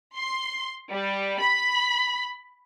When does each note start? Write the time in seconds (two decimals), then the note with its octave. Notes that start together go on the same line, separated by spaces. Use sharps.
0.16 C6
0.92 G3
1.41 B5